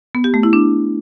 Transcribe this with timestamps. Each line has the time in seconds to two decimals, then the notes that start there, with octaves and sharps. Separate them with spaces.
0.15 B3
0.24 G4
0.34 A3
0.43 E4
0.53 D4